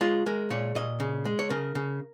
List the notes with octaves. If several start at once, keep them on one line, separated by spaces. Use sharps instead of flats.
G#3 F4
G#3 A#4
A#2 C#5
A#2 D#5
C#3
G#3
C#5
C#3 A#4
C#3